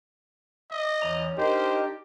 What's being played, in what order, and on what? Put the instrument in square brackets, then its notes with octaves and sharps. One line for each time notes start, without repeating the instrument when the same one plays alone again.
[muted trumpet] D#5 [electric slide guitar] E5
[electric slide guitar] E2 D5 A#5 [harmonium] C#4
[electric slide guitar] D4 D#4 [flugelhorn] G4 [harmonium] A#4 D#5 [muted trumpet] C5